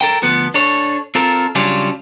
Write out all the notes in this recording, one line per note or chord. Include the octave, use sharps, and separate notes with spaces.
A4 A#4 G5
D2 F3 B3
D4 A4 C#5
C4 F4 A4 A#4
C#3 F#3 G3 C#4 D4 F4